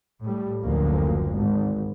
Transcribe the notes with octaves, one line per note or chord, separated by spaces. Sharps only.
A2 G3
F#1 D2 F3 A#3
G#1